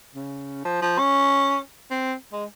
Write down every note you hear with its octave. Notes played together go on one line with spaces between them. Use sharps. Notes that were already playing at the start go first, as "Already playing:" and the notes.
C#3
F3
F3
C#4
C4
G#3